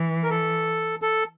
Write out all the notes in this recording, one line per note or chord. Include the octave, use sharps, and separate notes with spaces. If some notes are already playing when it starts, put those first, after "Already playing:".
Already playing: E3
A#4
A4
A4